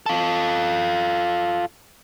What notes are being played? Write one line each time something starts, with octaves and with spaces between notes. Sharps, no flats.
F4 A4